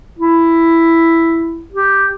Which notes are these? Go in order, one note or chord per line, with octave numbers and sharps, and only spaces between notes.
E4
G4